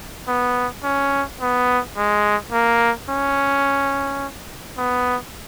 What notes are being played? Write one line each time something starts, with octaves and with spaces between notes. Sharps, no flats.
B3
C#4
B3
G#3
A#3
C#4
B3